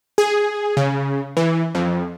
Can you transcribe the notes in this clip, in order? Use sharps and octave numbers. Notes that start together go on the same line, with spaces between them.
G#4
C#3
E3
F2